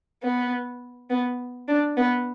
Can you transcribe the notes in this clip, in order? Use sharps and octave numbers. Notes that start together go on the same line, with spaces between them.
B3
B3
D4
B3